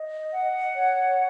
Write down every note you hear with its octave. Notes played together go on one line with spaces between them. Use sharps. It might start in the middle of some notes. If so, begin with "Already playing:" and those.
Already playing: D#5
F#5
C#5